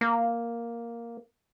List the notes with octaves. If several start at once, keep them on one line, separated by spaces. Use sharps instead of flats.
A#3